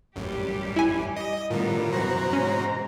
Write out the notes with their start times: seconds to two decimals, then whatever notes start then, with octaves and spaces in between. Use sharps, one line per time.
0.16 A1 F#2 G3 G4
0.76 E4 G#5
1.16 D#5
1.51 A2 D3 G3 B3 F4 A#4
1.93 F#2 B2 E3 F#4 C5 A#5
2.33 G#2 C#4